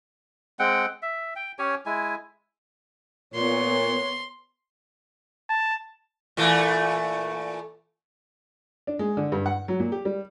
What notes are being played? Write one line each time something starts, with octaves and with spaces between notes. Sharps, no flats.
G#3 C4 F#5 G5
E5
G5
C#4 G4 C#5 G#5
G#3 E4 G#5
A#2 B3 C#5 C6
A5
A#2 E3 A3
D4
G#3
D3
G2
F#5
F#3
A#2
G4
G3